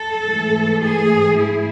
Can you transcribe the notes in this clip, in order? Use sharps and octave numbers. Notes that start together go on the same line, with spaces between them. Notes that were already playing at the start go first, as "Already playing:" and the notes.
Already playing: A4
G#2 E3 A3
G#4
F3 A3 E4